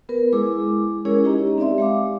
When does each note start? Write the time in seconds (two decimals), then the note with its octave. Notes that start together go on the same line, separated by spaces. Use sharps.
0.09 B3 A#4 B4
0.33 G#3 E4 G#4 D6
1.05 G#3 C#4 E4 G#4 A#4 C#5
1.24 D#4 G4 D#5 A#5
1.58 C4 G4 D5 E5 C6
1.78 G#3 F5 D6